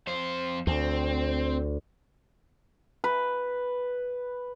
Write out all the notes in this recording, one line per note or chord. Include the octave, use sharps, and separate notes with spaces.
F2 C4 C5
D2 C4
B4